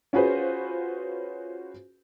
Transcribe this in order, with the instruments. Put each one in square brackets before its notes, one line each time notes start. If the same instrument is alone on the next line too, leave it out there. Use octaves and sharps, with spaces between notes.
[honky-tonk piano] C#4 F4 F#4 G#4 B4 C5